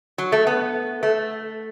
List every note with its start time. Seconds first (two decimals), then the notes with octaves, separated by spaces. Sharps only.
0.18 F#3
0.32 A3
0.47 B3
1.03 A3